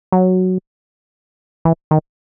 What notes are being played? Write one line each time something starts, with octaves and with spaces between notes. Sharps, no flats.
F#3
E3
D#3